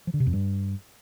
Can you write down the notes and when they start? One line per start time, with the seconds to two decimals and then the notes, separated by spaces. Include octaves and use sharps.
0.07 F3
0.14 D3
0.20 C3
0.27 F2
0.33 G2